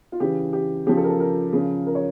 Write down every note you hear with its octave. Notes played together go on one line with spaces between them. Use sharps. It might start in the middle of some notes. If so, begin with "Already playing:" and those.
F4
C#3 E3 G4
G4
C#3 F3 G4
A4
A#4
A4
A#4
C#3 F3
A#4
C#5